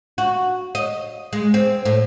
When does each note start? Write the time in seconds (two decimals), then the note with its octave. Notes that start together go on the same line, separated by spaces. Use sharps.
0.18 F#4
0.75 D#5
1.33 G#3
1.54 C4
1.85 A2